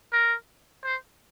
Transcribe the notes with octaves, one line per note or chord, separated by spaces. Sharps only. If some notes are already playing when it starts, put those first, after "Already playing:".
A#4
C5